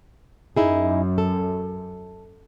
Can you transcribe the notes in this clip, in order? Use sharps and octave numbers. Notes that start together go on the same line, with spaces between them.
F#2 D#4 E4 G#4
A4